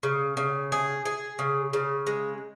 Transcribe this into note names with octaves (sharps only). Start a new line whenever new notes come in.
C#3
C#3
G#4
G#4
C#3
C#3
G#3